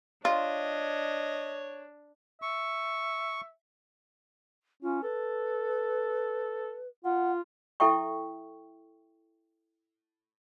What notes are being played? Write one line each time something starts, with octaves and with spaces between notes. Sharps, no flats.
D4 F4 C#5 D#5
E5 C#6
C#4 F4
A4 B4
F4 F#5
E4 A4 E5 G5 C#6